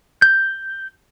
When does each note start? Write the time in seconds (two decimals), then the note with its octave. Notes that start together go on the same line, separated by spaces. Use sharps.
0.22 G6